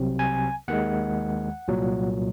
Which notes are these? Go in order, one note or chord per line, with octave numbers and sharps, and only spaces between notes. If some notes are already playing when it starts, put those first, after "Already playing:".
Already playing: C2 C3 F#3 C4
G#5
D#2 D#3 G#3 F#5
C2 A#2 F#3